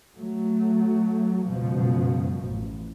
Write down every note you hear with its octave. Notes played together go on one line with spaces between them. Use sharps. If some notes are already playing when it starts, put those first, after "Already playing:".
F#3 A3
C#2 F#2 B2 F3
A1